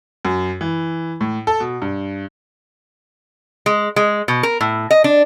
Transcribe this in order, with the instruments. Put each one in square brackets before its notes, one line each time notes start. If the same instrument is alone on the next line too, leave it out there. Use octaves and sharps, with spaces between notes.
[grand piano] F#2
E3
A2
A4
B2
G2
[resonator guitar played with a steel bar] G#3
G#3
B2
A#4
A2
D#5
D4